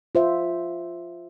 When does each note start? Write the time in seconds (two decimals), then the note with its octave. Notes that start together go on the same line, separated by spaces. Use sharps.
0.15 F4 C5 E5